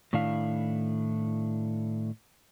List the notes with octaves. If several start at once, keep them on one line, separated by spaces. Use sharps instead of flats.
A2 D#3 A3 D4 E4 F5